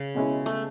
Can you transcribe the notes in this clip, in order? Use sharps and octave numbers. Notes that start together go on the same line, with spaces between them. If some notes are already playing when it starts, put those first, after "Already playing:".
Already playing: C#3
B2 G#3 C#4 E4
A3